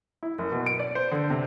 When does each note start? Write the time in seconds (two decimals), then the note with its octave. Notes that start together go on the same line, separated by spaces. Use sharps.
0.23 E4
0.39 F#1
0.52 B2
0.66 D7
0.80 D5
0.95 C5
1.11 D3
1.30 C3